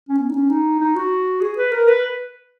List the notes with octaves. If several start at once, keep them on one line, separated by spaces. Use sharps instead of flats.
C#4
B3
D#4
C#4
D#4
D#4
F#4
G#4
B4
A#4
B4